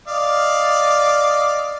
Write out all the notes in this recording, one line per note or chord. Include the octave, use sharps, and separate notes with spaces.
D5 D#5 F5